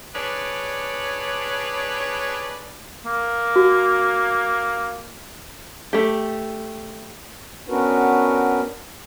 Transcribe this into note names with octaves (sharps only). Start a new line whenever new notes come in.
D4 G#4 B4 C#5 D5
A#3
F#4
A3 G4
B3 C#4 D4 F#4 A#4 B4